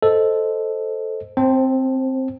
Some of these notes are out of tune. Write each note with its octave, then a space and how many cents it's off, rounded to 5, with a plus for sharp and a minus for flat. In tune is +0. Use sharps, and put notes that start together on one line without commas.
A4 +0 C5 +0 D#5 +5
C4 +0 C5 +25 A5 -10